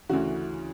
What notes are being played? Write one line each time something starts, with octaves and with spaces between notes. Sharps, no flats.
D2 C#3 E3 F#4